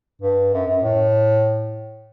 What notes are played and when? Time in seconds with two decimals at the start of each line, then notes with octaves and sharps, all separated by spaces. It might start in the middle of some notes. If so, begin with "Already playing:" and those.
0.22 G2
0.53 F#2
0.67 F#2
0.82 A2